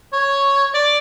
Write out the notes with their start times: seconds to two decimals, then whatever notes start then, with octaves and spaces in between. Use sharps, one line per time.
0.13 C#5
0.74 D5